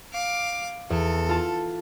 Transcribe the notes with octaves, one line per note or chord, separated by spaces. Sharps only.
F5 D6
E2 A4
F4 A5